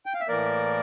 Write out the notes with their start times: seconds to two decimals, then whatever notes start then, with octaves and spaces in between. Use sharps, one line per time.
0.06 G5
0.14 F5
0.21 E5
0.28 A2 E3 A#3 A#4 D5